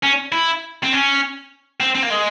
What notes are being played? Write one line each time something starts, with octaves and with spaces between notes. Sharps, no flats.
C#4
E4
C4
C#4
C4
C4
A#3
G#3